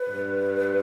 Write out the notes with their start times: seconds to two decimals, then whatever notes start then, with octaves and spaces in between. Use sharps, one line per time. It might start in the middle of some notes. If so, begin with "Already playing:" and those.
Already playing: B4
0.11 G2